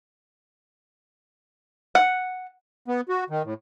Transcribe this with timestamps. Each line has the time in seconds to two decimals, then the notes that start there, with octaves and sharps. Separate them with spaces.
1.95 F#5
2.88 B3
3.09 F#4
3.30 D#3
3.44 A2